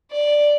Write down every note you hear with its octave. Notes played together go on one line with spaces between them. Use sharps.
D5